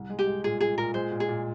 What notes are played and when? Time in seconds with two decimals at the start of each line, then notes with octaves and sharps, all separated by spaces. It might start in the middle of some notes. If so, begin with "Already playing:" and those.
Already playing: C2
0.10 G#3
0.19 G4
0.27 G#3
0.44 A#2 G#4
0.61 A#2 G#4
0.78 A#2 A#4
0.94 G#3 C5
1.11 A#2
1.20 G#4
1.29 A#2